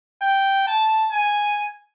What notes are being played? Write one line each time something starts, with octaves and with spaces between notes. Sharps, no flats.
G5
A5
G#5